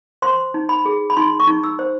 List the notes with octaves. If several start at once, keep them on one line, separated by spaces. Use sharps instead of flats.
C5 C6
D#4
B5
G#4
B5
D#4 C6
C#6
D#4
E6
C5